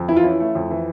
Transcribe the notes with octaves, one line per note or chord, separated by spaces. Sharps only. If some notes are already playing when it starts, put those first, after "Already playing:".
Already playing: F2
E3 E4
F4
C#4 E4
A3
F2
E3